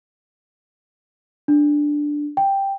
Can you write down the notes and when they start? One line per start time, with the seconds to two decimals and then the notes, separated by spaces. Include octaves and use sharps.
1.48 D4
2.37 G5